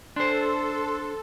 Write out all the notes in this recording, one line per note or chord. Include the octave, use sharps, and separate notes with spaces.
D4 A4 C5 C6